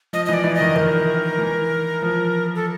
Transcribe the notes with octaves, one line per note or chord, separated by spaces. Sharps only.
F3 D#5
D#5
E3 D5
E3
D#5
D#3
D#3 A#4
E3
F3
A4